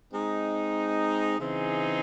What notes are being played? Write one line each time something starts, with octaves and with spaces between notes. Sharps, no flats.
G#3 C4 D#4
C#3 E3 C4 D#4 G#4